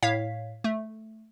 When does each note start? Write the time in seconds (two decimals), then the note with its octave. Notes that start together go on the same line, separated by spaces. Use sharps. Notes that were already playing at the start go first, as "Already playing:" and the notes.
0.03 A2 C#5 F5 B6
0.64 A3